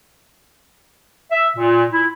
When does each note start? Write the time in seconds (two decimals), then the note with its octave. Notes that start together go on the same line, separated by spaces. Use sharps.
1.32 E5
1.57 A#2
1.92 E4